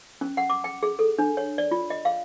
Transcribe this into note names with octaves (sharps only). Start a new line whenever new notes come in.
C#4
F#5
D6
G5
G#4
A4
D4
C#5
D5
F4
D#5
F5